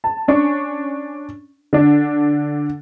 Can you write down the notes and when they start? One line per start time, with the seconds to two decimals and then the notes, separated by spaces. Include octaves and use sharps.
0.04 A5
0.28 C#4 D4 C#6
1.73 D3 D4